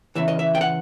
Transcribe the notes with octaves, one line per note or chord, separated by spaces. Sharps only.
E2 C#3 E3 E5
D#5
E5
G5
F#5